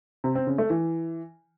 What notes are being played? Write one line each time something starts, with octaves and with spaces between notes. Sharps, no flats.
C3
C4
C#3
A3
E3